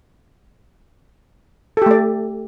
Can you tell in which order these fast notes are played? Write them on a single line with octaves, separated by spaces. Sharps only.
A4 G4 A3 D5